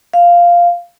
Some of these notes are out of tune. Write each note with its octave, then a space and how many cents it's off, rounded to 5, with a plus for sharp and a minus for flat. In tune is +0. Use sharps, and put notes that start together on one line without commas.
F5 -5